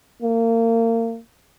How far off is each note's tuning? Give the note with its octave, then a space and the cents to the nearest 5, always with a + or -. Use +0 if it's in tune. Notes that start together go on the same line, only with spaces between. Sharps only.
A#3 -30